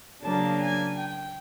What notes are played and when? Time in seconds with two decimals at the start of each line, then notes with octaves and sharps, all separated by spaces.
0.23 C#3 F#3 A#3 D4 A5
0.60 G#5
0.97 G5